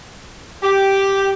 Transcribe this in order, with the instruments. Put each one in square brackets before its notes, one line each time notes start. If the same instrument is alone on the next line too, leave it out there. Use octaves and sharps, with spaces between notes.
[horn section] G4